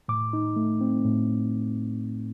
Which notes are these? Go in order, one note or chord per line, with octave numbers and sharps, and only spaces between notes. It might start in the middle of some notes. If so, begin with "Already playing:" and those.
A2 D6
D#4
A3
C4
A2